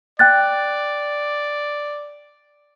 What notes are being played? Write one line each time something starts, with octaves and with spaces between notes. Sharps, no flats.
D5 G5 F#6 A6